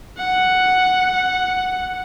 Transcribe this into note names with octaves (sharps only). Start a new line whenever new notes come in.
F#5